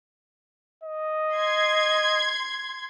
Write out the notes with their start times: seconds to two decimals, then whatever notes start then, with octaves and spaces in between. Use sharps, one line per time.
0.84 D#5
1.35 C6 G#6